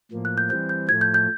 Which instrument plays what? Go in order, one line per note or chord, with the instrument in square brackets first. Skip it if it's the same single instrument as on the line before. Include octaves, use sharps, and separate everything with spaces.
[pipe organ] A2 F3 A#3
[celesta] F#6
G6
[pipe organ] E3 G3 C4 [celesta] G6
[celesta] G6
[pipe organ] A2 F3 A3 [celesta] G#6
[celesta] G6
G6